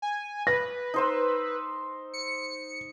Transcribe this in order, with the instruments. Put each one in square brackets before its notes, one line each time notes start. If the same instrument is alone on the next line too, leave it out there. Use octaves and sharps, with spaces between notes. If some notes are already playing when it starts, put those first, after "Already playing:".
[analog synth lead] G#5
[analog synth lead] B4 [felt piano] A#6
[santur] D#4 C5 E6
[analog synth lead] C#7